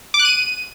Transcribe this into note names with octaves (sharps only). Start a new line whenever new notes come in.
D6
F#6
D#7